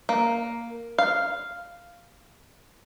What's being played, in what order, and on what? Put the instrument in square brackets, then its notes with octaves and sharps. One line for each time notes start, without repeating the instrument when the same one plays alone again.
[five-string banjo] A#3
F5